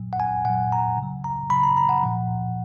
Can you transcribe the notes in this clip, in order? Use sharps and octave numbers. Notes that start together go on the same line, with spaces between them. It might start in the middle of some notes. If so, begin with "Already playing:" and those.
Already playing: A#2 F#3
F#5
G#5
A#2 F#3 F#5
A#5
C#3
F#3
A#5
C#3 F#3 B5
A#5
A#5
F#5
A#2 F3